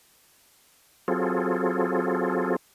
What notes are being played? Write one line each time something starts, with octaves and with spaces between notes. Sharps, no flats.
F#3 C4 F4 G#4 A4